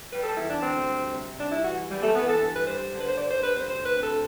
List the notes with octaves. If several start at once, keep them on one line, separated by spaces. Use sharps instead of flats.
G3 B4
A4
E2 E4
D4
D2 C4
G3
C3
G3 D4
E4
E3 F#4
E3 G3
A3
E3 B3
A4
G2
B4
G3 C5
D3
B4
C5
G2 D5
C5
G2 B4
C5
D2 C5
B4
C3
A4